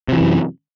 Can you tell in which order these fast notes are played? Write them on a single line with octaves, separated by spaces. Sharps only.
C3 F3 E3 F#2